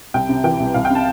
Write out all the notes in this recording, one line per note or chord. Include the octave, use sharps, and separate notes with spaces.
C2 G5
C3
E3 G5
C2
C2 F5
G5
C3
A5